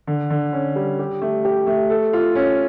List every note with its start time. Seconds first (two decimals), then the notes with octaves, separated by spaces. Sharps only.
0.07 D3
0.30 D3
0.53 C#4
0.76 G3
0.99 G4
1.22 A3
1.45 G4
1.67 A3
1.90 A4
2.13 F4
2.35 C#4